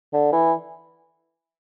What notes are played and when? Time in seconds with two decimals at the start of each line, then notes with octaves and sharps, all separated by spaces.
0.13 D3
0.33 E3